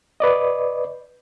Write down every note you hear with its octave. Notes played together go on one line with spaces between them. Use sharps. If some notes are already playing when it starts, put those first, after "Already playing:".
B4 D5 D#5